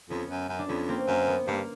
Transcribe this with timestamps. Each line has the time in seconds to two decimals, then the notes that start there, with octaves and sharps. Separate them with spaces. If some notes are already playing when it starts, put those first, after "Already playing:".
0.10 F2 B3 C#4
0.31 F#2
0.49 F#2
0.59 D4
0.69 F2 B3 C#4
0.88 A#3 C4
1.08 F#2 A#3
1.28 B3
1.48 G2 A#3